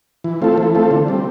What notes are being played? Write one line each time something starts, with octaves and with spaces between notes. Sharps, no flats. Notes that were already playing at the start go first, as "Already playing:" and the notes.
E3
A3 C4 F4 A4
E3
A3 C4 F4 A4
D3
G3 C4